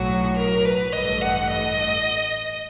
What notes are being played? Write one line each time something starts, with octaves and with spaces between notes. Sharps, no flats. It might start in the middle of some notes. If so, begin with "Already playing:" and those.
Already playing: B1 A2 F#3 F#4
A#4
B4
A1 G2 E3 A3 D#5
F#5
D#5